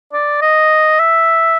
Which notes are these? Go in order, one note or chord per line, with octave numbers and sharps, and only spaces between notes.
D5
D#5
E5